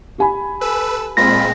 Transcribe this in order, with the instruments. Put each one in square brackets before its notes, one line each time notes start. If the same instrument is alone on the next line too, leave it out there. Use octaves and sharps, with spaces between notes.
[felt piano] G4 G#5 B5
[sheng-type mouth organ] A4 E6 [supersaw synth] B4
[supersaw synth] A#2 G#3 C4 [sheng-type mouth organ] F4 B5 [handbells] A#6